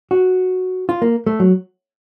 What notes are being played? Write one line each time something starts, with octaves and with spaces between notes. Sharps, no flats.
F#4
F4
A#3
A3
F#3